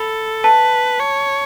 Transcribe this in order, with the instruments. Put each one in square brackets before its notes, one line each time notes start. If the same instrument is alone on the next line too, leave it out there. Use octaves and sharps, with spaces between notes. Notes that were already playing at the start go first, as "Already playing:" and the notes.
Already playing: [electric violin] A4 [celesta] B5
[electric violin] B4 [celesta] A5
[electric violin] C#5